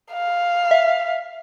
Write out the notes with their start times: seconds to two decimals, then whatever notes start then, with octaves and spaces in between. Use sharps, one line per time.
0.13 F5
0.71 E5